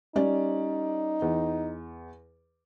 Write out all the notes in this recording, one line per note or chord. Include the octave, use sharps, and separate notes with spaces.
G3 C#4 D#4 D5
E2